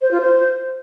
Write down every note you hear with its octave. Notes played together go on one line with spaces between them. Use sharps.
C5
F4
C5